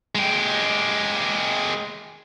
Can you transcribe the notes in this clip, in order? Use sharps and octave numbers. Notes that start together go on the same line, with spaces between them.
G#3 G4